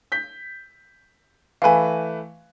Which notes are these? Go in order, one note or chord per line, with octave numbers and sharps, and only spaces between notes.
G6 B6
E3 A3 B4 F5 G#5